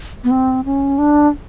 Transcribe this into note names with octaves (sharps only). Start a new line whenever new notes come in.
B3
C4
C#4
D4